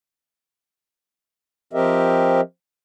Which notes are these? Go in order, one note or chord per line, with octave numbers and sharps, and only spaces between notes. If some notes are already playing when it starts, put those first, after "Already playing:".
F3 C4 G4 A#4 D#5 E5